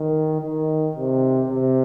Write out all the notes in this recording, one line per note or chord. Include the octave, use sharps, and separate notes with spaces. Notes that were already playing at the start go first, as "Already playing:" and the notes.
Already playing: D#3
D#3
C3
C3